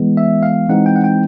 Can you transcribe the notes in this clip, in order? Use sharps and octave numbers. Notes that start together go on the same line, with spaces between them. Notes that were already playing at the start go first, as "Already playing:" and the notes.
Already playing: E3 G#3 B3
E5
F5
E3 G#3 C4 D#4 F#5
G5
F#5
G5